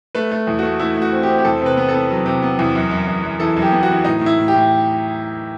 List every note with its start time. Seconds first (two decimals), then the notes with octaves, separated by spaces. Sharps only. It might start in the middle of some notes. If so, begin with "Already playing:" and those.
0.15 A3 B4
0.32 A3
0.47 E2
0.59 A3 F#4
0.79 A3 E4
0.96 A3
1.02 F#4
1.12 C4
1.23 G4
1.28 C4
1.38 G4
1.45 E2 A4
1.62 C3 B4
1.77 B3
1.89 A4
1.94 B3
2.11 F#3
2.26 C3
2.43 B3
2.59 E2
2.75 F#2
2.91 F#2
3.07 F#2
3.23 F#2
3.40 E3 A4
3.57 F#2
3.62 G4
3.72 B3
3.83 F#4
3.89 E3
4.04 A2 D#4
4.21 A2
4.26 E4
4.38 A2
4.48 G4
4.54 A2